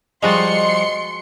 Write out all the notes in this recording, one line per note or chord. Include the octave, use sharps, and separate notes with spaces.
F3 G3 G#3 F#4 D#5 C6 A6 C#7